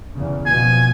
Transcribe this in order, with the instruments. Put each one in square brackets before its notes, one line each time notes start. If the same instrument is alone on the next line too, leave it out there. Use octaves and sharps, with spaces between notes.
[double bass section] E2 C#3
[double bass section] B2 F3 [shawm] G#5